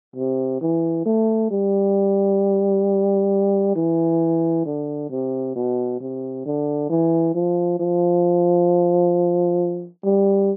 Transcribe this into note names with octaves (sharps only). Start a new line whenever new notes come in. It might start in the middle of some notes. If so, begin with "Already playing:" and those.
C3
E3
A3
G3
E3
D3
C3
B2
C3
D3
E3
F3
F3
G3